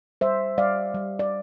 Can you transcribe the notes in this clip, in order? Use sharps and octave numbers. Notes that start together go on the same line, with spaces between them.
G3 C5 E5
G3 D5 F5
G3
D5